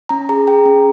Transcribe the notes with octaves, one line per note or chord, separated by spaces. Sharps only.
C#4 A#5
G#4 A#5
G#4 G5
C#4